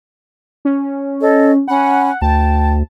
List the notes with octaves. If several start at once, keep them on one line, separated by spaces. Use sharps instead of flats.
C#4
A4 C#5 D#5
C#4 F#5 B5
D2 G5 A5